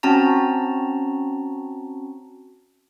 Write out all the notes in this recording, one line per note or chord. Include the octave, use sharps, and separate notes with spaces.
C4 C#4 F#4 A5 A#5